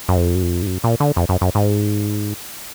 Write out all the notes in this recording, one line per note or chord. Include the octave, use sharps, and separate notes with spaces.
F#2
F2
F#2
F2
G#2
F#2
A#2
D3
F2
F#2
F#2
G#2